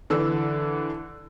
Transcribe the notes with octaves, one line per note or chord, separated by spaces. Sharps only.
D3 E3 E6